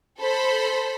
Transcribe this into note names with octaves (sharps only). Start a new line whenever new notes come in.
A4 C5 B5